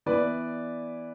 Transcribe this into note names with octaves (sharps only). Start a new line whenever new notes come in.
E3 B3 E4 B4 D5